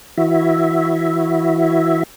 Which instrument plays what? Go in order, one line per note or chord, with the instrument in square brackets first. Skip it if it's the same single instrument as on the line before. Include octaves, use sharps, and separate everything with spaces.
[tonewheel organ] E3 E4 F#4 E5